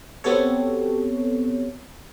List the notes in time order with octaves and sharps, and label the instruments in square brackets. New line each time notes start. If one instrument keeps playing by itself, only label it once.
[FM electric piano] B3 C4 F#4 G4 A4 C#5